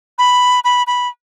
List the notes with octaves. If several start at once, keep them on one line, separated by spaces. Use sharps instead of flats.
B5
B5
B5